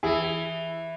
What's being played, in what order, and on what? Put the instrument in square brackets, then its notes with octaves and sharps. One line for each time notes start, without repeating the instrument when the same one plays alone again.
[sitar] E3 [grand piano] E4 G#4